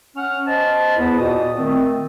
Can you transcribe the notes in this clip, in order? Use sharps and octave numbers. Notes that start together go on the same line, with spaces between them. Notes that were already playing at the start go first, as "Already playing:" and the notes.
C#4 F#5 F6
C5 D#5 A5
E2 B3 E4 B4
A#2 F#4 D#5 A5 D#6
D#3 A3 C4